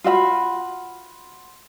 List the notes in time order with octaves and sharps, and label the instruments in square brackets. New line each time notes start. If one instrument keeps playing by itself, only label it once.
[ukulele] F4 F#4 E5 B5